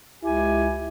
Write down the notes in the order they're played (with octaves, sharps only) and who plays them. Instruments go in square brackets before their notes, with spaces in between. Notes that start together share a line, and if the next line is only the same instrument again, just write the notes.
[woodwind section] C#2 G4 G#5 [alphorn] E4